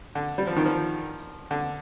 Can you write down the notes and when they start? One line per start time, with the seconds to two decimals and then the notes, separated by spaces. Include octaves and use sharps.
0.15 D3
0.38 G3
0.47 F3
0.56 D#3
0.66 F3
1.51 D3